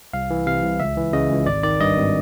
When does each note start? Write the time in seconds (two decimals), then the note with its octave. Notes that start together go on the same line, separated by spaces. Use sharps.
0.13 C2 F5
0.30 E3
0.46 C3 F5
0.63 C2
0.80 C#2 E5
0.97 E3
1.13 C#3 D#5
1.30 C#2
1.46 G#1 D5
1.63 D#3 D5
1.80 G2 D#5
1.96 G#1